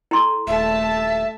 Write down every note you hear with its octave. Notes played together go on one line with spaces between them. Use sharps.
E4 A4 C6
D#1 A3 E5 A5